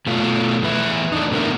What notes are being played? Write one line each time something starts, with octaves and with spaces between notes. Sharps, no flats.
B2 A3 F4
E2 A2 B4 E5
A3 D4 D#4
A2 D3 B3 A#4 E5